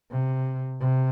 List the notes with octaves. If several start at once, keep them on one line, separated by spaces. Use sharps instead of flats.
C3
C3